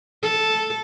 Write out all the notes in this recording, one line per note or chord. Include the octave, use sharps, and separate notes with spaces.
A4